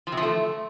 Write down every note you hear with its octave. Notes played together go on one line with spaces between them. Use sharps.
F3
C3
F3
A3